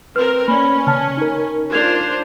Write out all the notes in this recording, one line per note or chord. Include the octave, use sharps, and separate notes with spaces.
C4 A#4 B4 F6
A#3 C#4 D5 B5
C#3 A5 F6
D#4 A#4
D4 F4 C5 G#6 F7